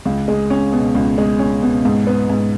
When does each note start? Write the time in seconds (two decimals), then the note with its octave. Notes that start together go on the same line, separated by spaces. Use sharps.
0.05 C#2
0.28 G#3
0.50 C#4
0.72 B2
0.95 C#2
1.18 G#3
1.39 C#4
1.62 B2
1.85 G#2
2.07 B3
2.30 G#2